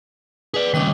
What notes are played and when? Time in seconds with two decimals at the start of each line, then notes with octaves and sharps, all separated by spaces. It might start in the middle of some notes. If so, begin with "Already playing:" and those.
0.54 G#4 B4 D5
0.74 D#2 C#3 G3 D#5 D6